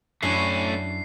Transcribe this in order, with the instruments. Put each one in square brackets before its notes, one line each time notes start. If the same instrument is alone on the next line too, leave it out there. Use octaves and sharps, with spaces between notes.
[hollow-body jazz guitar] F#2 [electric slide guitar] A3 C#4 [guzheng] D4 E4 F#4 [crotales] C7